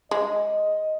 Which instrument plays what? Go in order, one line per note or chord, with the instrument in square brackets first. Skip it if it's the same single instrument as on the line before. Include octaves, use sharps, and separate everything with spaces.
[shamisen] G#3 [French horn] D#5